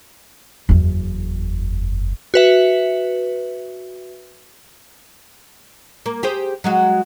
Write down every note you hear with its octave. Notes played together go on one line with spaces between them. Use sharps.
F#1 E2
F#4 B4 E5
A#3
G4 G#4 C5
F#3 G#3 F#4